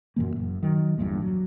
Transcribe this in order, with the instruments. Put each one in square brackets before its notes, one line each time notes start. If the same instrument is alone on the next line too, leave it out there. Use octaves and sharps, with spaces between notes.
[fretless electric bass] F#2 A#2 E3 A#3
F#1 F#2
D#3 F#3
G1 E2 G2 A#2
F#3